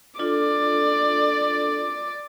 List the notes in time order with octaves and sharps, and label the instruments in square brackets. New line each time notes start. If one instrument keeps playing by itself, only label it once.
[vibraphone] D4 F4 A4 [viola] D5